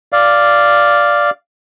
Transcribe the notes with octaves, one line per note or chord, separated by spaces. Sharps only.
D5 F5